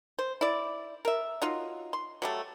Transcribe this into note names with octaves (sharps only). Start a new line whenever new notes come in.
C5
E4 D5
A#4 E5
F#3 D#4 F4
C6
F#3 G3 A3